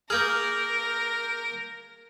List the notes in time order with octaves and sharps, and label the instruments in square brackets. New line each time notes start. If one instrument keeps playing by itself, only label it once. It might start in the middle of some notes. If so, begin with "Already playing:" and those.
[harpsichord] A#3 G#4 [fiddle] A#4 [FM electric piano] F6 G6